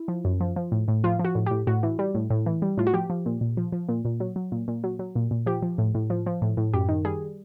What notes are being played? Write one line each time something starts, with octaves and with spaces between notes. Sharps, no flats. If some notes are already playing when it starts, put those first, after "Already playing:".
Already playing: E4
F3
F#2
F3
F3
A2
A2
F3 F4
F3
F#4
A2
A2 G4
A2 F#4
E3
G3
A2
A2
E3
G3
A2 F4
F#4
F3 G4
F3
A#2
A#2
F3
F3
A#2
A#2
F#3
F#3
A#2
A#2
F#3
F#3
A#2
A#2
F3 G4
F3
A2
A2
F3
F3
A2
A2
F#2 G4
D#3
G3 G#4